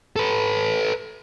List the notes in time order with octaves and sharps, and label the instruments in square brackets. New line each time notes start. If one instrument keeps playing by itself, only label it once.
[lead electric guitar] A4 B4